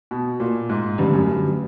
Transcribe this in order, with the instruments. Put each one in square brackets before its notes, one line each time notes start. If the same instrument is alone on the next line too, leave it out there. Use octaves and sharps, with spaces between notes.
[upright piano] B2
A#2
G#2
[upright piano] G2 [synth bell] D3 F3 A3 C#4
[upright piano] F#2
G2